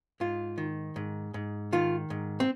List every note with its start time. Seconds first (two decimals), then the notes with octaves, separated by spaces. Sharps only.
0.20 G#2 F4
0.58 D#3
0.96 G#2
1.34 G#2
1.72 D#3 F4
2.10 G#2
2.40 C4